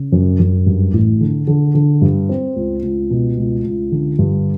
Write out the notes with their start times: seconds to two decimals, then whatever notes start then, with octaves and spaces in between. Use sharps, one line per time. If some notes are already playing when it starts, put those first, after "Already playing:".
Already playing: C#3
0.12 F#2
0.39 F#2
0.66 G2
0.93 A1
1.21 D3
1.47 D3
1.75 D3
2.02 G2
2.29 C4
2.56 C#2
2.83 C#2
3.10 B2
3.38 C#2
3.65 C#2
3.92 D3
4.19 G2